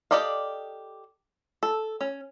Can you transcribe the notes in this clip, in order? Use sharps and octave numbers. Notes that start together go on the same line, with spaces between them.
G4 A4 D5 D#5 F5
A4
C#4